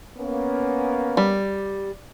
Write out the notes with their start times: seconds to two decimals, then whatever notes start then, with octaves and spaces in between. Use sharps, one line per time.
0.18 A#3 B3 C#4
1.17 G3